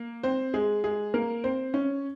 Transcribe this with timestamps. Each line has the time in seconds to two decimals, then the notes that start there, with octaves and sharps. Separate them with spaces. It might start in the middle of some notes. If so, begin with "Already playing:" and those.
Already playing: A#3
0.23 C4 C5
0.54 G#3 G#4
0.84 G#3 G#4
1.14 A#3 A#4
1.44 C4 C5
1.74 C#4 C#5